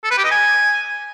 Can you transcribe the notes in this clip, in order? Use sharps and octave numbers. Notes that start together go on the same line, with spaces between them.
A4
B4
G4
D#5
G#5